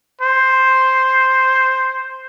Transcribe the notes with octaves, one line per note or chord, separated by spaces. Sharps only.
C5